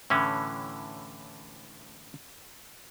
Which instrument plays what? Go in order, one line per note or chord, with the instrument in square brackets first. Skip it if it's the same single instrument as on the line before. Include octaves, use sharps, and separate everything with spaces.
[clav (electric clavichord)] A2 D3 E3 C#4